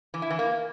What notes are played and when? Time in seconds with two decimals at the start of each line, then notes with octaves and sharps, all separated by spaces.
0.14 E3
0.22 E4
0.30 E3
0.39 A#3